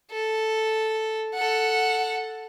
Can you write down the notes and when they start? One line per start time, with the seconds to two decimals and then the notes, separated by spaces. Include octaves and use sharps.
0.12 A4
1.34 A4 F#5